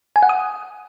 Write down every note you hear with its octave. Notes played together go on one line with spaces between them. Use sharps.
G#5
F#5
D#6